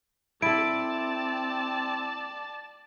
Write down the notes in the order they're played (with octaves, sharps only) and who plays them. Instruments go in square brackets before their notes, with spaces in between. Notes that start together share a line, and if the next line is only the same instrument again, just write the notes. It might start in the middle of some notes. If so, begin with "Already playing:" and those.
[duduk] C4 [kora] E4 A4 [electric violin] D5 A5 [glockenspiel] D7